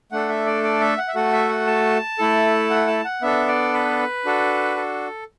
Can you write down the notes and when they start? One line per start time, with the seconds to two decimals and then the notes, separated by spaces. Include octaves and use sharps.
0.12 A3 D4 A4 F#5
0.29 E5
0.46 D5
0.63 D5
0.81 E5
0.98 F#5
1.08 E5
1.15 A3 F#4 A4 F#5
1.33 E5
1.49 F#5
1.67 A5
2.19 A3 E4 A4
2.70 F#5
2.87 A5
3.05 F#5
3.22 B3 D4 A4 E5
3.48 D5
3.73 B4
4.25 D4 F#4 A4
4.77 A4